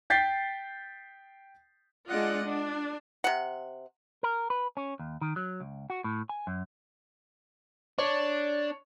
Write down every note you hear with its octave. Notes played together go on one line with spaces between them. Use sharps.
G5 G6 A6 B6 C7
G#3 D4 F4 D5 D#5 F#5
D4
C3 F#5
A#4
B4
C#4
D#2
D#3
F#3
C#2
F#4
A2
G#5
F#2
D4 C#5